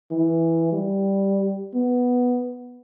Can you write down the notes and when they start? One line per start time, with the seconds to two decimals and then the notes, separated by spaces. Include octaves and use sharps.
0.11 E3
0.72 G3
1.74 B3